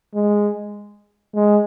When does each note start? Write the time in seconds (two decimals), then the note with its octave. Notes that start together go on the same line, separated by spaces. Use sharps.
0.14 G#3
1.34 G#3